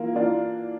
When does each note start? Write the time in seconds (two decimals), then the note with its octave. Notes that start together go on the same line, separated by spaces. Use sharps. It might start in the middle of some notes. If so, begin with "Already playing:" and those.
Already playing: E3 A#3 F4
0.15 E3 A#3 D4 F4